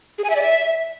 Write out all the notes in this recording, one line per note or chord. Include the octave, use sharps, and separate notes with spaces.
G#4
G#5
E5
D5
E5